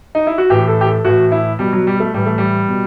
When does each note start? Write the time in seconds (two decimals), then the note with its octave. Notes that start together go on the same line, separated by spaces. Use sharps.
0.15 D#4
0.27 E4
0.38 F#4
0.50 A2 E3 G4
0.68 A4
0.81 G4
0.87 A4
1.05 A2 E3 F#4
1.32 E4
1.59 B2 G3
1.72 F#3
1.87 G3
2.00 A3
2.14 A2 E3 G3
2.26 A3
2.38 G3
2.69 B2